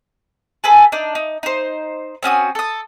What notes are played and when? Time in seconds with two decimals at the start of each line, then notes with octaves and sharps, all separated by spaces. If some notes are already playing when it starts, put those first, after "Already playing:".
0.64 G#4 A4 B4
0.92 D4 D#4
1.15 D#4
1.43 D#4 C5
2.23 C4 C#4 F#4 D#6
2.55 A4 D#6